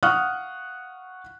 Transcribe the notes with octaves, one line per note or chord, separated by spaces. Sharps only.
F5 F#5 C#6 D#6 F6 F#6